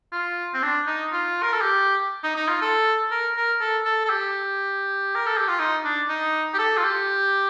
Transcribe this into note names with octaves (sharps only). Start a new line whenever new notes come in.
F4
C4
D4
D#4
F4
A#4
A4
G4
D#4
D#4
F4
A4
A#4
A#4
A4
A4
A4
G4
A#4
A4
G4
F4
D#4
D4
D#4
G4
A4
F4
G4